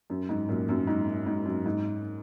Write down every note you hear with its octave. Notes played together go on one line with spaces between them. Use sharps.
F#2
G#2
F#2 A#2
F#2 A#2
G#2
G#2
F#2
G#2